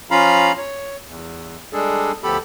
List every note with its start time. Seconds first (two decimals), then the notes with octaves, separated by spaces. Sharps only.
0.11 F3 C#4 F4 F5 A#5 B5
0.57 C#5
1.08 E2
1.73 G3 G#3 D4 G#4 A4
2.24 D2 F3 B3 G4 A4 B5